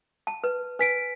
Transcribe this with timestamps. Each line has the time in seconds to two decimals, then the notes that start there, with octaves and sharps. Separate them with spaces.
0.27 A5
0.44 B4
0.79 B4 G#5 B6 D7